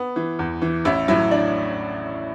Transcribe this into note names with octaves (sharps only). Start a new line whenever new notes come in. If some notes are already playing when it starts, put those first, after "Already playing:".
Already playing: B3
E3
E2
E3
A1 E4
A2 F#3 E4
D4